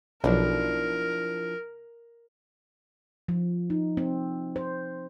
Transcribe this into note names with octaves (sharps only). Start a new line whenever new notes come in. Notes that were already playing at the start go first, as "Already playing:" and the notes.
B1 F3 D4 E4 A#4
F3
D#4
C4
C5